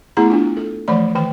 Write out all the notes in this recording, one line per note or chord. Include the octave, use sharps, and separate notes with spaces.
A3 B3 E4 G#4 A#5
B3 D4 F4
A4
E3 F3 A3 D5 B5
D#3 E3 G5